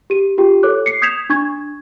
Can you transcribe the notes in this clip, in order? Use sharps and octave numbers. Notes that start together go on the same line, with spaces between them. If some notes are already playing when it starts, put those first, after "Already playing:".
G4 D#7
F4 G4 G5
A4 C#5 D6 F#6
C7 C#7
D#6 G6 G#6 B6 E7 F7
D4 C#6 G#6